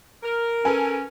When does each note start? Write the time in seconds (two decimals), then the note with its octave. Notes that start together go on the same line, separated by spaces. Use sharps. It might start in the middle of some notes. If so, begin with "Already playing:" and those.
0.23 A#4
0.65 C#4 A4 B4 G#5